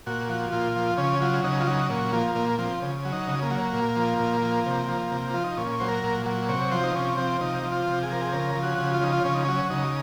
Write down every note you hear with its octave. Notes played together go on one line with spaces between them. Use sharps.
A#2 F#4
F3
A#2 F4
F3
C#3 C#4
F#3 F4
C#3 D#4
F4
F#3 D#4
A#2 C#4
F3 A#3
A#2 A#3
F3 C4
C#3
F#3
D#4
C#3
A#3
F#3
A#2
F3
A#2
F3
C3
F3
C3
F3 F4
D#4
A#2 C#4
F#3 C5
A#4
A#2
F#3
C3 C#5
F3 C5
D#4
C3 C#4
F3 C4
C3 D#4
F3
F4
C3
G#4
F3 A#4
G#4
C#3 A#4
F3
F#4
C#3
F4
F3 D#4
F4
C#3 C#4
D#4
F#3 C#4
C#3 D#4